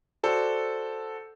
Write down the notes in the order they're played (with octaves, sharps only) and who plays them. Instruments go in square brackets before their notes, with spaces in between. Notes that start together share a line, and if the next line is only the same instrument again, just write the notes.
[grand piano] F#4 A4 C5 D5